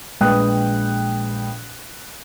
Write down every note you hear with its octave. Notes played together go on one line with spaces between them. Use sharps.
A#1 G#3 B4 G5 D#6 F#6